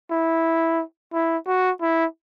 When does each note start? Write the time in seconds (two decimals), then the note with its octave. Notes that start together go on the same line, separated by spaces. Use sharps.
0.11 E4
1.13 E4
1.47 F#4
1.81 E4